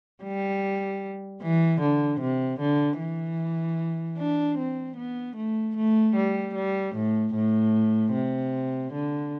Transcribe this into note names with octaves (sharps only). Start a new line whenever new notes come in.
G3
E3
D3
C3
D3
E3
D4
C4
B3
A3
A3
G3
G3
A2
A2
C3
D3